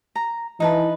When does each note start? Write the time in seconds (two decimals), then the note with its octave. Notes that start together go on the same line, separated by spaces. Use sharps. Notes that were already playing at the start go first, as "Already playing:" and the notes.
0.15 A#5
0.60 E3 D#4 B4 A5